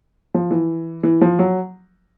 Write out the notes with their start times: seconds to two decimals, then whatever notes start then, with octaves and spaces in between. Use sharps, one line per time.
0.34 F3
0.51 E3
1.03 E3
1.21 F3
1.39 F#3